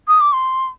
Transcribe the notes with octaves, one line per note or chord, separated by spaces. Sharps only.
D#6
D6
C6